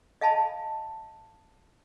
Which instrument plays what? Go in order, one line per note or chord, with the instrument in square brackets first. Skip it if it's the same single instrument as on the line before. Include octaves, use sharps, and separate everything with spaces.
[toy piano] D#5 F5 G#5 A5 B5